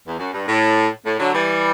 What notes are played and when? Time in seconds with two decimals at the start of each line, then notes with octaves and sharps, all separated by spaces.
0.07 E2
0.19 F#2
0.33 G2
0.47 A2
1.05 A2
1.19 D3 F#3
1.34 E3 G3